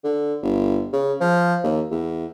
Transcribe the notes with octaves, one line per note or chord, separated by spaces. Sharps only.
D3
G1
C#3
F3
D#2
E2